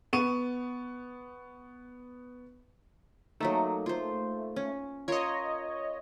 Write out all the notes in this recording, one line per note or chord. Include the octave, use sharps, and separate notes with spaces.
B3 C#6 D#7
F#3 A3 A#3 D#4
F4 C5
C#4
F4 A#4 C#5 D#5